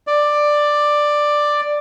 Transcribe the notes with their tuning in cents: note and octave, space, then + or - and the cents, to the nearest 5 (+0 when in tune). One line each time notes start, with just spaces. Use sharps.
D5 +10